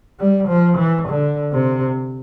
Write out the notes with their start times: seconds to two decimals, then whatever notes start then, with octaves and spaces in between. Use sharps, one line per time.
0.19 G3
0.48 F3
0.78 E3
1.08 D3
1.52 C3